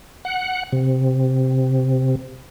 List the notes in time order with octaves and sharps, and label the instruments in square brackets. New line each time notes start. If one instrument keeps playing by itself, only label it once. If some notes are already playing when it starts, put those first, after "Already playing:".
[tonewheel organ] F#5
C3